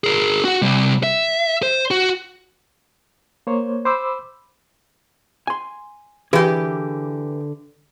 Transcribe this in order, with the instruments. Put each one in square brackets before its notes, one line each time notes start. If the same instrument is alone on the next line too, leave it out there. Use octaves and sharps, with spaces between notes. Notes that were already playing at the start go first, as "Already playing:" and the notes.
[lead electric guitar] G#4 A#4
F#4 F#5
C3 G3
E5
C5
F#4
[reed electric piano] A#3 C5 C#5
C5 B5 D6 E6
[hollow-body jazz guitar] G#5 C6
[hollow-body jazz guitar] D3 G#4 B4 [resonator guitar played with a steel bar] E3 G4